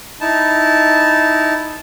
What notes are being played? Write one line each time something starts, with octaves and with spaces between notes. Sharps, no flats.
D#4 E4 A5